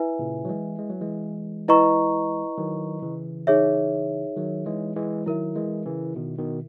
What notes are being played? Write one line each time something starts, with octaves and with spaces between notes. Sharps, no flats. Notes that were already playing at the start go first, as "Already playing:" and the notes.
Already playing: E4 B4 E5 G#5
A#2 C#3
F#3
E3 G#3
G#3
F#3
E3 G#3
E4 B4 D#5 A#5 C#6
D#3 F#3
C#3 E3
D#4 G#4 C#5 E5
D#3 F#3
E3 G#3
E3 G#3
D#3 F#3 E4 A#4 E5
E3 G#3
C#3 E3
B2 D#3
B2 D#3